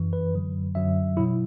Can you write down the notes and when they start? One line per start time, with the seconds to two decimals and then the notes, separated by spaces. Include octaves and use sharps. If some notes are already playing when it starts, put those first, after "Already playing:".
Already playing: F#2 E3
0.13 B4
0.34 F#2 D3 F#3
0.75 F#2 D3 F#3 E5
1.17 B2 F#3 E4